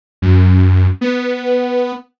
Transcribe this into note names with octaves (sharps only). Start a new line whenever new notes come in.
F#2
B3